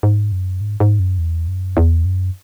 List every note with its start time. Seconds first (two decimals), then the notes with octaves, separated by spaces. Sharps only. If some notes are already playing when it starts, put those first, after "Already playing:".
0.03 G#2
0.32 F#2
0.61 G#2
0.80 G#2
0.99 F#2
1.18 E2
1.48 F#2
1.77 E2
2.05 F#2